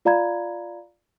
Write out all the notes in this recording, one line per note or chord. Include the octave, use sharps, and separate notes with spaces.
F4 D5 F5 A#5 B5 G#6